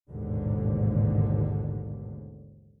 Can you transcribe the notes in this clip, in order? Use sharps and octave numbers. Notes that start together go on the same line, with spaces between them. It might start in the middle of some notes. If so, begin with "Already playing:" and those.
A1 D#2 G#2 B2 D3